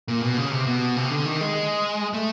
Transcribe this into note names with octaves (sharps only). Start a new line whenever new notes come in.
A#2
B2
C#3
C3
B2
C3
D3
D#3
G#3
A3